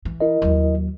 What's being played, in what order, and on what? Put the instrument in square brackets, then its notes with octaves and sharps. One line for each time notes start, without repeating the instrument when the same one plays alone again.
[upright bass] E3
[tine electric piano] E4 A#4 D#5
[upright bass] D#2 F#3